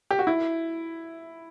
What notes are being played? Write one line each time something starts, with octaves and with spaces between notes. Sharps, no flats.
G4
F#4
E4